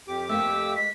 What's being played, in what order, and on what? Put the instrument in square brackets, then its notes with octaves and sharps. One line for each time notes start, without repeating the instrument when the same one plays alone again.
[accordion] F2 G4 D6
[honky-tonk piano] A3 A#3 [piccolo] E6
[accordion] G#3 [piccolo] B6